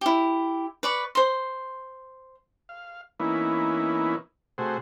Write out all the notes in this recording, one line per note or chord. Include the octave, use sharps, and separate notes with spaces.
E4 G4
B4 D5 C#6
C5 C6
F5
E3 A#3 B3 C#4 D#4 E4
C3 A3 F#4 G#4 C5